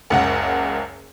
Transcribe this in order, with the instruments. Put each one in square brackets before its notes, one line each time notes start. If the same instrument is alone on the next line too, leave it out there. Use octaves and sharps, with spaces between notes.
[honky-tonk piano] F#1 C#2 F#5